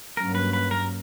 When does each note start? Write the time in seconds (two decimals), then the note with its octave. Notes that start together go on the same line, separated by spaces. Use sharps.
0.17 G2 F#3 A#3 C#4 A#4
0.35 B4
0.53 B4
0.71 A#4